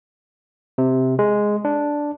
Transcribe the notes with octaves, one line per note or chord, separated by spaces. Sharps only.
C3
G#3
D4